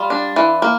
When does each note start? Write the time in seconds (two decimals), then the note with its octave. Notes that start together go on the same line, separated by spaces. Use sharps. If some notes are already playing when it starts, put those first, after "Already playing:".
Already playing: G3 F4
0.10 D4
0.36 E3
0.62 A#3